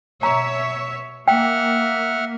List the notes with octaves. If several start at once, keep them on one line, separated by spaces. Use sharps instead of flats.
B2 C#5 E5 A#5
A#3 E5 F#5 G5 F6